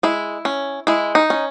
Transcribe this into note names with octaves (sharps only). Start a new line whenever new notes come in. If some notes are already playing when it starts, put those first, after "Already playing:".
G#3 E4
C#4
G#3 E4
D#4
C#4